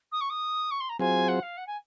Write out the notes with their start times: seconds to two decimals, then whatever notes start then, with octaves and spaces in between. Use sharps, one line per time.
0.12 D#6
0.21 C#6
0.30 D#6
0.71 C#6
0.80 C6
0.89 A#5
0.99 F#3 C4 F4 G#4 C5 G#5
1.28 F#5
1.42 F5
1.57 F#5
1.67 G#5